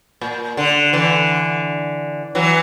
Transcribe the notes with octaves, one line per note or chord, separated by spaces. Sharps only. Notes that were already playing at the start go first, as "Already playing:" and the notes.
A#2
D3
D3 E3
E3 F#3